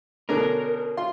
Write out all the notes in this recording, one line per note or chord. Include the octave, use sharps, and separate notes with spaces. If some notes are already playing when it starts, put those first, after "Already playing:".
B2 D3 C#4 A#4
F4 C6